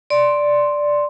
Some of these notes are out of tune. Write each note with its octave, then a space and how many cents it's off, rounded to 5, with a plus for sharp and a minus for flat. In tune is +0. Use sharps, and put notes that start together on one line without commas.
D5 +0 C6 +0